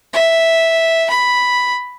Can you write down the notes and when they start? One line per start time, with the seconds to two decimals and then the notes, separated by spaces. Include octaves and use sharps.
0.13 E5
1.10 B5